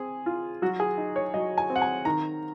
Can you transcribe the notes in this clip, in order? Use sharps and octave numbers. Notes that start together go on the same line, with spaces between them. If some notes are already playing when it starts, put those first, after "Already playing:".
Already playing: C4 G#4
F4
F#3 F#4
G#4
D#4
C#5
F#3 D#5
G#5
C4
F#5
G#5
D#3 A#5